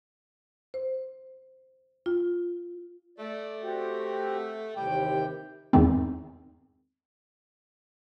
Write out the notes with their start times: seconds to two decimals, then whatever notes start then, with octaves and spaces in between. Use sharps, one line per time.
0.74 C5
2.06 F4
3.18 A3 D5
3.62 C4 F#4 G4
4.76 D#2 C3 E3 G3 G5
5.73 E2 G#2 D#3 C4